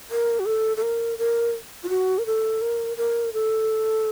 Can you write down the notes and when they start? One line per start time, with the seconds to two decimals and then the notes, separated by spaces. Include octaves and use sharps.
0.11 A#4
0.40 F#4
0.46 A4
0.77 A4
0.82 A#4
1.18 A#4
1.84 F4
1.89 F#4
2.18 A#4
2.26 A4
2.61 A#4
2.97 A#4
3.33 A4